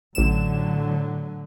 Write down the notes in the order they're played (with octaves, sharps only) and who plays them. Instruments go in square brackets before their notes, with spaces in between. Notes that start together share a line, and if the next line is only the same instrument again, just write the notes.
[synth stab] A1 E7 [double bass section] A2 D3 F#3